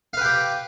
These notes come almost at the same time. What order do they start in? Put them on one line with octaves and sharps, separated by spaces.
F5 B4 G5 G4